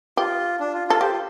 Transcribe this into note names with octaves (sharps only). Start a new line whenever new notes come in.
F4 G4
D4
F4
F4 A4
G4 C5
F4